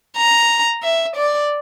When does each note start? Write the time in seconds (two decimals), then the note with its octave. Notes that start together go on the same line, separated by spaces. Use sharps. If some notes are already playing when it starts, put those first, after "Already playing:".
0.17 A#5
0.83 E5
1.16 D5